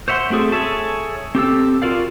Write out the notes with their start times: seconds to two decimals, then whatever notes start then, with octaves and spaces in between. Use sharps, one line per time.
0.08 C5 C#5 E5 F#5 C6
0.30 A3 C4 F#4 G#4 A4
0.52 G#4 A4 C#5 E5 A5
1.35 C4 G4 A4 E6
1.82 F4 F#4 A#4 D5 F5